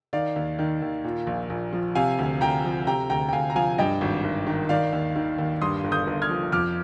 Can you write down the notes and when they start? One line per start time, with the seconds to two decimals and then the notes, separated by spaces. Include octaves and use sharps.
0.13 D#3 D5 F5
0.36 D#2
0.59 D#3
0.82 D#2
1.04 A#2
1.27 A#1
1.50 A#1
1.73 F3
1.95 C3 F5 G#5
2.19 D2
2.41 D2 G5 A#5
2.64 F3
2.87 C3 G5 A#5
3.10 D2 G5 A#5
3.29 G5
3.33 D2 F5 G#5
3.50 A#5
3.55 F3 F5 G#5
3.78 G2 D#5 G5
4.01 G#1
4.24 G#1
4.47 D#3
4.69 D#3 D5 F5
4.92 D#2
5.16 D#3
5.38 D#2
5.61 G2 C6 D#6
5.84 G1
5.92 D#6 G6
6.07 G1
6.22 F6 G#6
6.29 F3
6.52 F2 D6 F6